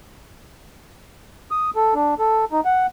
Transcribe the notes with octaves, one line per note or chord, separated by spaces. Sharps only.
D#6
A4
D4
A4
D#4
F#5